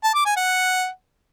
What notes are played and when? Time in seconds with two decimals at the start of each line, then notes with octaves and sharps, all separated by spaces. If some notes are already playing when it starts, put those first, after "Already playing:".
0.04 A5
0.15 D6
0.26 G#5
0.36 F#5